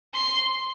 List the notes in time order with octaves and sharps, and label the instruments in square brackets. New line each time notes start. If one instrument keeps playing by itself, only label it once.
[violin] C6